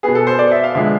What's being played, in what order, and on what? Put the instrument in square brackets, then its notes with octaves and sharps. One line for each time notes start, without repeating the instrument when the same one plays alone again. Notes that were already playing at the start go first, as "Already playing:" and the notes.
[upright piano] B2 B3 G#4
A4
C5
D5
E5
F5
D3 F3 G#3 B3 E5